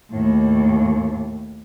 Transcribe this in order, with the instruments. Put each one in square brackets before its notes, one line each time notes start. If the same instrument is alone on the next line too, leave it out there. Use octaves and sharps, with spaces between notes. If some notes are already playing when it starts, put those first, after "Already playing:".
[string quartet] D#2 A2